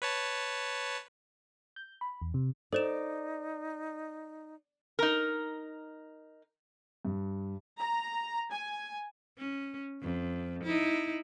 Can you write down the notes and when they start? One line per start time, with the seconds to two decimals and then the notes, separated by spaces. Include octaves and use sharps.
0.02 B4 C#5 A5
1.76 G6
2.01 B5
2.22 E2
2.34 C3
2.73 D#4 A4 C5 D5 E7
4.99 D#4 A#4
7.05 G2
7.79 A#5
8.51 G#5
9.38 C#4
10.02 F2
10.64 D#4 E4